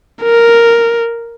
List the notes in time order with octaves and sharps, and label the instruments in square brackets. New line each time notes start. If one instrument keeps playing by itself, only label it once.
[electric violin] A#4